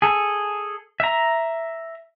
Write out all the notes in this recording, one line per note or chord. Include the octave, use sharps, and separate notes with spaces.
G#4 A4
E5 A#5